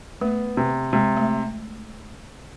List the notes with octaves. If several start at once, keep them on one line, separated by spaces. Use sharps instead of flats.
A3 B3
C3
C3 G#3
A3